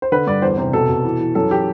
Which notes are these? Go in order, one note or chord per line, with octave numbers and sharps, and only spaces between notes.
C5
D3 B4
G2 D5
E2 C5
C3 C5
B2 A4
B2
E3
E3
F#2 A4
E3 G4